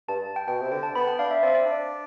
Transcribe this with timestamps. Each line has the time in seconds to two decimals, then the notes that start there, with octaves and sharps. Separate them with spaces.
0.08 G2 A5
0.36 G5
0.48 B2 G5
0.61 C3
0.72 D3 G5
0.83 A5
0.95 B3 B5
1.08 G5
1.19 D4 F5
1.31 E5
1.43 C4 D5
1.54 D5
1.66 D4